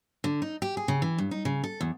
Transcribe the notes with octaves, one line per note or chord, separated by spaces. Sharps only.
D3
D#4
G4
G#4
C#3
E3
G2
D#4
C#3
A4
E2